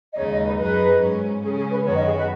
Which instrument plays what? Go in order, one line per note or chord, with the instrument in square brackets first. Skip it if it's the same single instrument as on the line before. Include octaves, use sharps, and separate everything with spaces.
[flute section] D#5
[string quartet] D#2 C#3 G#3 D#4 [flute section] C#5
[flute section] D#5
B4
[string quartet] F#2 F#3 D#4 G#4 [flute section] B4
[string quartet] G#2 F#3 C#4
[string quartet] C#3 G#3 C#4 [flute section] G#4
[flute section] G#4
B4
[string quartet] F#2 D#3 F#3 B3 F#4 [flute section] C#5
[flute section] D#5
G#4
B4